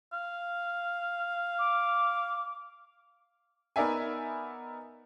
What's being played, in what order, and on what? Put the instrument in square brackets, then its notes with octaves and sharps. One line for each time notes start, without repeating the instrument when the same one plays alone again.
[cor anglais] F5
[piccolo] D6
[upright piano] B3 D#4 A#4 D5 E5 G#5